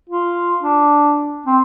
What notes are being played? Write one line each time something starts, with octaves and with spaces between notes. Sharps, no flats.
F4
D4
C4